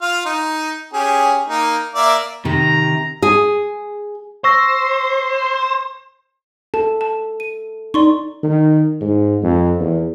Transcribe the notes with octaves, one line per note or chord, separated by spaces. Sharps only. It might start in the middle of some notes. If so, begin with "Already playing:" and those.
F4 F5
D#4
C#4 G4 G#4
A#3 D#4
A#3 D5 E5
C3 D#3 A#5
G#4
C5 C#6 E6 A#6
A4 A5
A5
D#7
D#4 D5 C6 C#6
D#3
G#2
F2
E2